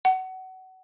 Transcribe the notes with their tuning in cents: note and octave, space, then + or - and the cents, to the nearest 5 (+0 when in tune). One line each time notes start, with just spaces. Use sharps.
F#5 +25